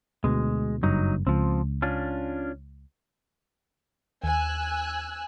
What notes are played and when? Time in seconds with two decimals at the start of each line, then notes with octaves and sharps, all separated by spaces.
0.24 D2 B2 G#3
0.83 F#1 G2 F#3 D#4
1.27 C#2 F3 C4
1.82 C#4 D4 F4
4.24 D#2 G#5 E6 F#6